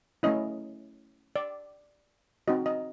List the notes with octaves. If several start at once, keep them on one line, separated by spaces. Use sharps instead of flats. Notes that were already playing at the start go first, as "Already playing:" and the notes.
A3 C#4 E4 D#5
D5
C4 D#4 F#4 D#5
D#5